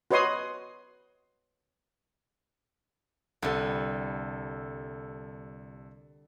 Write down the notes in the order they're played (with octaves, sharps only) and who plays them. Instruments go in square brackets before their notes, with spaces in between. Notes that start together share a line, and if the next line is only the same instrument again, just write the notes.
[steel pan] F#4 B4 C#5 D#5 C6 D#6
[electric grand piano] C2 A4 [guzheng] D3 G3